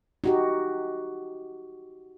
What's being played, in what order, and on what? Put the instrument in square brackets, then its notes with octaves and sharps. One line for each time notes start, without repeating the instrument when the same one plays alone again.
[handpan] D#4 F#4 G4